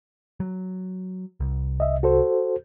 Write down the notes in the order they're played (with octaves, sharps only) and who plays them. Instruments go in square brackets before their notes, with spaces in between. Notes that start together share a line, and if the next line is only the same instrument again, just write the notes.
[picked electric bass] F#3
C2
[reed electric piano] D#5 E5
F#4 A4 C5